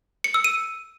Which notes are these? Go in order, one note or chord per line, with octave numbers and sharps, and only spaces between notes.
C#7
E6
D#7